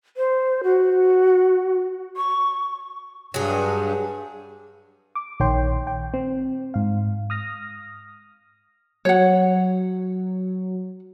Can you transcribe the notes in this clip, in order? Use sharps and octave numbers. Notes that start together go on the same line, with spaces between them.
C5
F#4
C#6
G2 F#3 G#4
D6
A#1 D#3 C#5 G5 C6
G5
C4
G#2 F5
D#6 F6 A#6
F#3 C#5 F#5